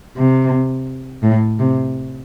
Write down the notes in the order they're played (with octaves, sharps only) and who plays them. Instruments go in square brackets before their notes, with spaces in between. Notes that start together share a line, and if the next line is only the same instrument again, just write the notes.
[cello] C3
A2
C3